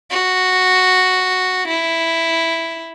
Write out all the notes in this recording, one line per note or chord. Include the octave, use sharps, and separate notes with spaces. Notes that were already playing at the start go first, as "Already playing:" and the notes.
F#4
E4